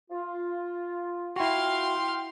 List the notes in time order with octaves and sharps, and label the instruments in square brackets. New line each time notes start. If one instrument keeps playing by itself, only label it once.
[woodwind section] F4
[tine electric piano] E4 F#4 [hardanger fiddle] F5 C6 [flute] G5